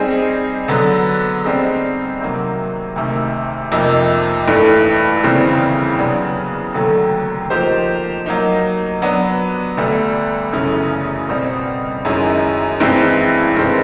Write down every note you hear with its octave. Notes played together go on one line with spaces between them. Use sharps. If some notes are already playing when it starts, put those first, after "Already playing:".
Already playing: G3 C4 D#4 G#4
D3 F#3 B3
G3 C4 D#4 G#4
C3 D#3 F#3 A#3
D2 C3 D#3
F2 C3 F3 A#3 D#4
G2 E3 A3
D#2 C#3 E3 G3 C4
C#3 F#3 B3 D4
D#2 D3 F#3 A3
F3 A#3 D#4 G4 C5
F#3 A#3 D#4
F#3 B3 D4
D2 D3 G3 B3 D4
F#2 C#3 E3 A3 C#4
B2 G3 C4
F#2 D#3 G#3 C#4 E4
G2 E3 G#3 C4 E4
G2 D#3 G#3 C4